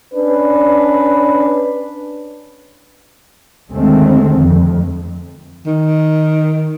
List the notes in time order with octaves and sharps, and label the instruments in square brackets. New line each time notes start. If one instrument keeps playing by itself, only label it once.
[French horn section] C#4 D4 B4
[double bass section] D#2 D3 D#3 G#3 A3 C4
F2
[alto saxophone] D#3